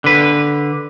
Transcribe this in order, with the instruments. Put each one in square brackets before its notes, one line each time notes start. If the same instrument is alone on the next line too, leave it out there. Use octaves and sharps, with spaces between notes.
[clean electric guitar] D3 B4